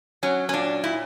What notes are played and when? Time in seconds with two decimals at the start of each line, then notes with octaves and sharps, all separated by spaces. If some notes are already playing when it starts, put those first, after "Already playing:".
0.23 F#3 C#4
0.49 C#4
0.53 A#2 D4
0.83 A#2 E4